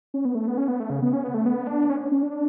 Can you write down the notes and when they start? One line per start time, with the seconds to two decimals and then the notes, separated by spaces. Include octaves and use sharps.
0.14 C#4
0.25 B3
0.35 A3
0.48 B3
0.58 C#4
0.68 B3
0.80 A3
0.90 C#3
1.02 B3
1.13 C#4
1.24 B3
1.34 A3
1.46 B3
1.67 D4
1.90 C#4
2.00 C#4
2.12 C#4
2.23 D4